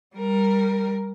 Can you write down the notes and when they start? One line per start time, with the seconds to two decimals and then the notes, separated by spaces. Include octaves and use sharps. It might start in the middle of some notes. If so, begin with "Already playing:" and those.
0.16 G3 A#4